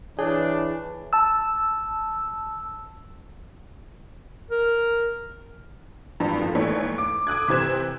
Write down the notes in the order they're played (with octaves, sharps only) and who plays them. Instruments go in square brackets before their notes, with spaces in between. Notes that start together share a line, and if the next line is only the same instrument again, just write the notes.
[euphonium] E3 [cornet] D4 [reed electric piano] G#4 [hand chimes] C#5
[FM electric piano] A5 E6
[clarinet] A#4
[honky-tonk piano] G2 E3 F3
A2 D#3 F3
A#1 G#2 E3 A3 C#5
D6
D6 D#6 F#6 G#6
C3 E3 C5 G#6 E7